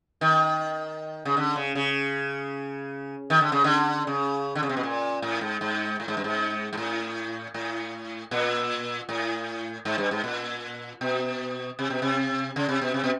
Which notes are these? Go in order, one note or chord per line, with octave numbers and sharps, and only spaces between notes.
D#3
C#3
D3
C#3
C#3
D#3
D3
C#3
D3
C#3
D3
C#3
C3
B2
A#2
A2
G#2
G#2
A2
G#2
G2
G#2
G#2
A2
A2
A#2
A2
G#2
G2
G#2
A#2
B2
C3
B2
C3
C#3
C3
B2
C3
B2